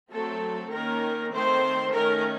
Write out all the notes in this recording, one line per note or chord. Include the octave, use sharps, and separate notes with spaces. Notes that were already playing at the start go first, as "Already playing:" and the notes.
F#3 A3 C4 A4
D#3 A#3 C#4 A#4
D#3 A3 C4 C5
D#3 A3 C#4 A#4